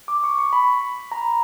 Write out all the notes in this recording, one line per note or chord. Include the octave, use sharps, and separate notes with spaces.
D6
C#6
C#6
B5
A#5